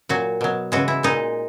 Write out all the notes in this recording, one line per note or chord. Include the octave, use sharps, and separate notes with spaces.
A#2 F#3 F#4
B2 F#3
C#3 E3 G#3 F#4
E4
A#2 G#3 D#4